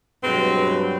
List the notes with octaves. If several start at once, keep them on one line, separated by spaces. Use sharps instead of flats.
G2 B2 F#3 G#3 C4 B4